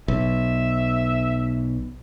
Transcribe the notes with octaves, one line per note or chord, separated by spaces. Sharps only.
B1 E5